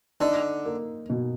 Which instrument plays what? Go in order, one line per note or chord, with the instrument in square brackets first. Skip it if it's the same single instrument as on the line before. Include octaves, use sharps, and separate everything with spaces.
[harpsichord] D3 [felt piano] D#4
[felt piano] A#3
B2